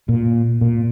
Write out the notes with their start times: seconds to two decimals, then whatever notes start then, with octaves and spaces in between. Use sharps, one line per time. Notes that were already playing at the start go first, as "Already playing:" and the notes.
0.09 A#2
0.61 A#2